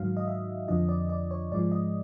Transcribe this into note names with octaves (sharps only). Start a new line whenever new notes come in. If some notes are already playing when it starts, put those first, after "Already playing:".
Already playing: G#2 D#3 F#3 F5
D#5
E5
F2 D3 F3 D#5
D5
D5
C#5
G#2 F3 G#3 D5
D#5